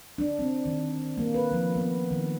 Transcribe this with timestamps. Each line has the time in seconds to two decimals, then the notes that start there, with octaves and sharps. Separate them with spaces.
0.18 D4
0.39 C4
0.66 D#3
1.17 A#3
1.34 B4
1.51 F3
1.76 B3
2.11 D#3